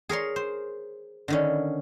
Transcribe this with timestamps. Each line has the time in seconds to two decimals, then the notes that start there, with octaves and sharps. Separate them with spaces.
0.09 G#4 A#4 C#5 C6
0.36 C5
1.28 D3 D#3 C#4